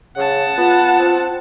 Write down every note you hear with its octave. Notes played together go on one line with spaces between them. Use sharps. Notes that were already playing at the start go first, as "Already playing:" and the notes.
C#3 F#5 A5
B3 F4
C4